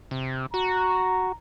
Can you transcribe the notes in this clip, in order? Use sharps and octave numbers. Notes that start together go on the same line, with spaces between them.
C3
F#4 A#5